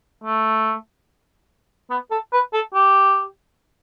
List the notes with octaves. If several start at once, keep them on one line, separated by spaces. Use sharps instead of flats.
A3
B3
A4
B4
A4
G4